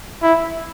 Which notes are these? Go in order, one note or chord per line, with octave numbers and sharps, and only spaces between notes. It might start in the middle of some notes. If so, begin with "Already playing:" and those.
E4